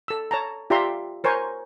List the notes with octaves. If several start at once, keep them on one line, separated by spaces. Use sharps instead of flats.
A4 E6
C#5 A5 A#5
F4 G4 D5 E5 A#5 C6
A#4 C5 C#5 G#5 C#6